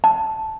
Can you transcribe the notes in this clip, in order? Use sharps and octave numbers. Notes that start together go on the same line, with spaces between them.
A5